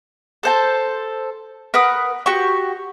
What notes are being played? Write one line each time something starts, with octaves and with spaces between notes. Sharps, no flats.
A4 C5 A5
A#4 B4 F#5 D#6
F#4 G4 C#6